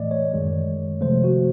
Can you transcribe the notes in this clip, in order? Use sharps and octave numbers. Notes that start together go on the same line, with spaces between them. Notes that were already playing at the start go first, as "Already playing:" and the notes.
Already playing: A2 E3 A3 D5 D#5
C#5
F#2 D#3 G#3
C3 F3 A3 C5
F#4